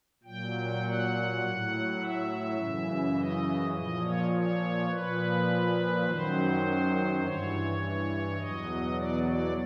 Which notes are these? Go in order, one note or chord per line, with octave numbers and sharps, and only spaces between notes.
A#2 F#3 G5
F#5
A2 F#3
E5
F#2 C#3 E3
D#5
A#2 F3 D#5
C#5
C#5
A#2 F3 B4
F#2 D#3 F#3 C5
G2 E3 C#5
E2 B2 F#3 D#5
D5
D5